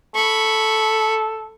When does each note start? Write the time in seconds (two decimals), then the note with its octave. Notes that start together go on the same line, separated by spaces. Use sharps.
0.15 A4 B5 C#6